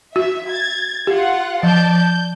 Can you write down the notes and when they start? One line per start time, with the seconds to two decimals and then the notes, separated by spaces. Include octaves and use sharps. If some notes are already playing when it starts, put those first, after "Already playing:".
0.16 F#4 E5
0.50 G#6 A6
1.07 F4 G4 F#5
1.63 F3 D5 A5 G6
1.94 G6